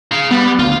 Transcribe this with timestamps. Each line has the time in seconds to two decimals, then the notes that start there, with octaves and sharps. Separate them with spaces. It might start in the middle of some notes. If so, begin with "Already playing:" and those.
0.12 G#4 F5
0.31 G3 B3
0.59 D2 F4